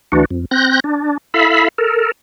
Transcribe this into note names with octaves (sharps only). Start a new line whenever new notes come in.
D2 E3 D4 F#4
F2
C4 F#6 G6 A#6
D4
E4 A4 E5 F5 B5
A4 A#4